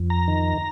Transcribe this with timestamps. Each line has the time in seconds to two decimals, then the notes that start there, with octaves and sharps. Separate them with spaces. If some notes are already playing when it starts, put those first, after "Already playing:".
Already playing: F2
0.10 A#5
0.28 D#3